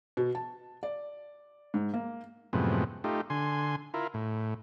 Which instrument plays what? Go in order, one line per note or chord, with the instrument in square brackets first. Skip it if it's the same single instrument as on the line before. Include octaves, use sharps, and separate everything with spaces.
[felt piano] B2
A5
D5
G#2
A#3
[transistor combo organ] F#2 A2 C3 F3 G#3 B3
A3 D#4 F4 G4
D3 G#5 C6
E4 F4 A#4
A2